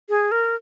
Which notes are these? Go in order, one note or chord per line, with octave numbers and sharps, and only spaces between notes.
G#4
A#4